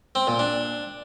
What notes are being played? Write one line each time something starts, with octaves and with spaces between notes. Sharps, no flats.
C4
A#2
D4